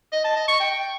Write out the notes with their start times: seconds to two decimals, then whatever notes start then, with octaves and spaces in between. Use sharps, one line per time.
0.12 D#5
0.24 A5
0.36 D#5
0.48 C#6
0.60 G5